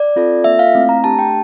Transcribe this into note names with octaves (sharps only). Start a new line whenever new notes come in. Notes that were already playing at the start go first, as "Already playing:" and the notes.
Already playing: D5
C4 F4 A4
A#3 F4 A4 E5
F5
A3 C4 E4
A#5
A3 D4 G4 A5
G5